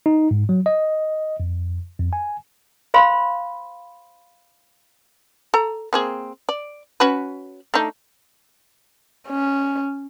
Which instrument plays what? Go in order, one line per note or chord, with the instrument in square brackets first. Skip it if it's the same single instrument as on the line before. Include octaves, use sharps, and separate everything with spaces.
[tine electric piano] D#4
G#2
F#3
D#5
F2
F2
G#5
[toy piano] C5 F5 B5 C6
[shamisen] A4 A#5
A#3 C4 G#4
D5
C#4 F#4 B4
A3 D4 D#4
[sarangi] C#4